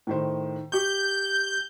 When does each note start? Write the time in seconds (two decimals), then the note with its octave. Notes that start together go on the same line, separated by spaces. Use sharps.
0.07 A2 D#3 C5
0.72 G4 C#6 G6